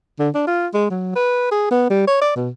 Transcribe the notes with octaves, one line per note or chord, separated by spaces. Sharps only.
D3
D4
F4
G#3
F#3
B4
G#4
B3
G3
C#5
D5
B2